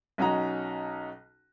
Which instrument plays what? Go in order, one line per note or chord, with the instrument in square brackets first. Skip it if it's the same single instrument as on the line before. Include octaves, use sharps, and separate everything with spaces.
[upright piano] B1 C#4 D#4 F#4 A#5